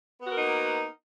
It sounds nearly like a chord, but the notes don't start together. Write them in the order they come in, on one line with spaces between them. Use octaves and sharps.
B3 F#4 A#4 D#4 A#3